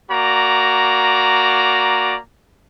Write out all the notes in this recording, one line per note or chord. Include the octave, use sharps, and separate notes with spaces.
A#3 F#4 D5 A#5